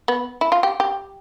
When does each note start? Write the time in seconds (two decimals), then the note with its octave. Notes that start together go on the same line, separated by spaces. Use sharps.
0.08 B3
0.41 E4
0.52 F4
0.63 G4
0.80 G4